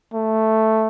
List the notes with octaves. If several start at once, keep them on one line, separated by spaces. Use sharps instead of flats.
A3